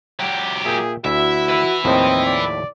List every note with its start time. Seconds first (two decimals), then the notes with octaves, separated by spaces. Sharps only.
0.20 F#3 G4
0.65 A#2 G#4 E5 G5
1.05 D2 E4 F#4 E5
1.50 B4 E5
1.85 D#2 A2 F3 C4 D#5
2.26 D5